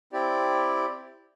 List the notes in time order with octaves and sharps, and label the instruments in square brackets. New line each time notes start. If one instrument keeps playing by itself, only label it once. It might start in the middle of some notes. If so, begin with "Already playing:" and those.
[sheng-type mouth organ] C4 E4 G4 D5